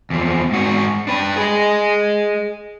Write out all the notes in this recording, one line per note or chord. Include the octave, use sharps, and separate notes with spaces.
E2 F3
G#2 F#4
D4 B4
G#4 D#5